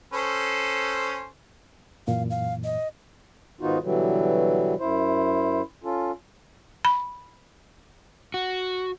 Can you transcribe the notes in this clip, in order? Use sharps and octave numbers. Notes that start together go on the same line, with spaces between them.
C#4 A4 C5
F#2 A#2 E3 F5
F5
D#5
G#2 D#3 B3 D#4 F4 F#4
B2 D3 E3 F#3 G3
F#2 E4 C5
C#4 F4 A4
B5
F#4